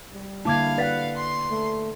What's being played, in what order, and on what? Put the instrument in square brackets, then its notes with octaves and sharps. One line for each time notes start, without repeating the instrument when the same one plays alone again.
[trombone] G3
[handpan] D3 A#3 E4 [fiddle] F5 [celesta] A5 D6 G#6
[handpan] B4 F#5 [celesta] D5 A6 B6
[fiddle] C6
[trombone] A3